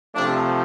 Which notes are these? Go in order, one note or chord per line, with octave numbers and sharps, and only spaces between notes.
C3 F3 A3 D4